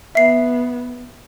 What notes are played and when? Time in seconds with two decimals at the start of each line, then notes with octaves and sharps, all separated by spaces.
0.15 B3 E5 C7